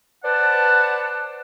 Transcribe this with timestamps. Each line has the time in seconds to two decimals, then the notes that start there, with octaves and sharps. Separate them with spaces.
0.24 B4 C5 D5 F#5 A5